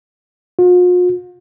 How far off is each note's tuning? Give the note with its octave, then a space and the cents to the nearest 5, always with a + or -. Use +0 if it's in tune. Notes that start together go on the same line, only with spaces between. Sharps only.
F4 +45